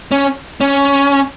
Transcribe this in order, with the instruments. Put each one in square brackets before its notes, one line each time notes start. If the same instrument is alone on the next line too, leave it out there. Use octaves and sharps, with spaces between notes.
[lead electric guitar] C#4
C#4